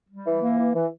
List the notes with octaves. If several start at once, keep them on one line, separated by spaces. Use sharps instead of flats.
G3
E3
A#3
E3
E3